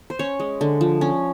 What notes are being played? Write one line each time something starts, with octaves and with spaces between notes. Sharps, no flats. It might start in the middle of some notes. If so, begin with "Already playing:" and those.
C5
C#4 C#5
G#3
D3
F3
C#4